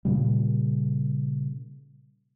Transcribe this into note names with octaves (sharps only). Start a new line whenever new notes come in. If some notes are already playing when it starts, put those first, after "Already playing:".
A#2 C#3 G3